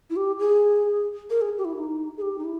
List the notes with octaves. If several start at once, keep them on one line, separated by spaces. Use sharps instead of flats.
E4
G4
G#4
A#4
G#4
G4
E4
D#4
G#4
G4
D#4
E4